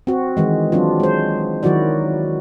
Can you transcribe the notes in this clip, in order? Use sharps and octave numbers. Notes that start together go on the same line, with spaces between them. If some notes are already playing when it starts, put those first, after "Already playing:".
C4 F#4
D#3 E3 G#3
F#3 C4 D4 F4
G#3 C5
D#3 F#3 E4 F#4 D5